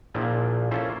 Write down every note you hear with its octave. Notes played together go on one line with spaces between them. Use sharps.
A#1 A#2 F3 E4 F4
A#3 C#4 E4 F4 A4 C5